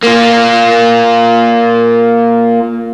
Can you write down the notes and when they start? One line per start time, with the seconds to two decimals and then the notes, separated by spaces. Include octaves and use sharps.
0.03 A#3 F4